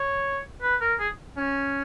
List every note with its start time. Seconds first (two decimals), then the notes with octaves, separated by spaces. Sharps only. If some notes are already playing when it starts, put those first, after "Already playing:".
Already playing: C#5
0.62 B4
0.81 A#4
0.99 G#4
1.37 C#4